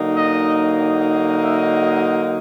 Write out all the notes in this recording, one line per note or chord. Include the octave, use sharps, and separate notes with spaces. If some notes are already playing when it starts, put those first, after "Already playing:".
Already playing: D3 F#3 A#3 D#4
D#5
E5
D#5